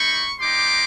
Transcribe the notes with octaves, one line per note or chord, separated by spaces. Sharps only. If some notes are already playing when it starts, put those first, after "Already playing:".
Already playing: G3 A#3 D#4 B5 C#6
G3 A#3 D#4 G4 C6 D6